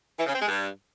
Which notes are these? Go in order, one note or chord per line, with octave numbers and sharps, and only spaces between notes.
E3
C#3
C4
G#3
G2